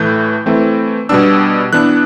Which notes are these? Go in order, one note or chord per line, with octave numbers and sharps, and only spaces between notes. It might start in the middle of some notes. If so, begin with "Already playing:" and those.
Already playing: A2 E3 A3 G6
E3 A3 C4
B2 G3 B3 D4 E6
E3 B3 D4 F#6